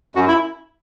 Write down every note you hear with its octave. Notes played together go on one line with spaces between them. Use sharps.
F#2 F#4
E4